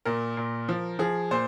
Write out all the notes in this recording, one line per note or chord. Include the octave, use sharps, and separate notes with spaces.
A#2 A#4
A#2
F3
F3 G#4
A#2 C5